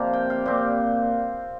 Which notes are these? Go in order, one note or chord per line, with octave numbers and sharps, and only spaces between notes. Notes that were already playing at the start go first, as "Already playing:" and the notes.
Already playing: C3 F3 A#3 D5 F5
G5
F5
A#2 G3 C4 G4